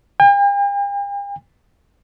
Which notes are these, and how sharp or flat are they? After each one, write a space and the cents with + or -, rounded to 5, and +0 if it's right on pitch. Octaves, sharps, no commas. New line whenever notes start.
G5 +45